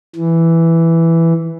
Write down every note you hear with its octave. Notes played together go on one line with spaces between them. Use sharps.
E3